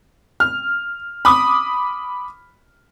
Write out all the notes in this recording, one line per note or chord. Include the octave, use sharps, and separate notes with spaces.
F6
B5 D6 D#6